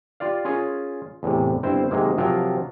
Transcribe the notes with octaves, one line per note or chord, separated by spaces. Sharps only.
F4 G4 D5 F5
C#4 F4 G#4 A#4 C#5
E2 A2 C3
G1 C4 E4 C5 F5
G#2 C3 D#3 F#3 G#3 A#3
C3 F3 F#3 F4 G4 A#4